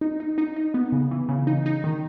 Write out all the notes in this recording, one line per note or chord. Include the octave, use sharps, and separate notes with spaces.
D#4
D#4
D#4
D#4
B3
C#3
E3
C#3
D#4
D#4
D#3